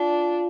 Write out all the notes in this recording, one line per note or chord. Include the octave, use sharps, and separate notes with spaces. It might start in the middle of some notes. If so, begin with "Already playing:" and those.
Already playing: D4 F4